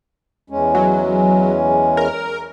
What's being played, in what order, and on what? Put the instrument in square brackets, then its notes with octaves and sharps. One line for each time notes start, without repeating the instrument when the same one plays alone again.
[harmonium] E2 G#3 C#4
[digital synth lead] F#3
A#4